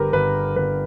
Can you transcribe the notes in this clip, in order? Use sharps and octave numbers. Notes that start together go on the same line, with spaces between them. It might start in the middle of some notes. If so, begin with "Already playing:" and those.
Already playing: G1 D3 G4 A#4 B4
G1 B4
G1 B4